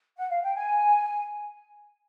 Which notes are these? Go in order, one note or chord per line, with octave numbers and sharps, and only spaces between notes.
F#5
F5
G5
G#5